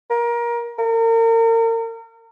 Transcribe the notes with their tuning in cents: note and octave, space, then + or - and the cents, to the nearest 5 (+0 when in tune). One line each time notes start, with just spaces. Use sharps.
A#4 +25
A#4 -35